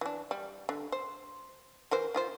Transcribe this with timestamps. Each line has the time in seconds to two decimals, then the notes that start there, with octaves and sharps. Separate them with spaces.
0.01 E3 D4
0.31 G3
0.69 D3
0.92 C5
1.91 E3 A#4 C5
2.14 D#3 F4 C5